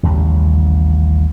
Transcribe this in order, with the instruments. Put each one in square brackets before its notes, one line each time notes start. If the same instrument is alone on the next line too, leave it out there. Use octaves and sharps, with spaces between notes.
[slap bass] A1 D#2 C#3 G3